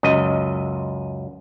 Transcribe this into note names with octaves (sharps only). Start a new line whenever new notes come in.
C#2 F#2 D#5